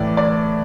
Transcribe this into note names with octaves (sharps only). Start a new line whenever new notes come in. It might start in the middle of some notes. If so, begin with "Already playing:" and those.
Already playing: A2 E3 D5
D5